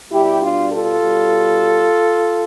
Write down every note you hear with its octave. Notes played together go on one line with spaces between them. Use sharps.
B2 G3 E4 G4
D4 F4
F4 A4
B2 G3